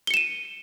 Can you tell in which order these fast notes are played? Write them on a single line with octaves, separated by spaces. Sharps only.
G7 C#7 E7 D#7